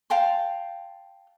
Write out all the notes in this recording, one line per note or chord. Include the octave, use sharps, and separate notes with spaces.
F5 G5 A5 C6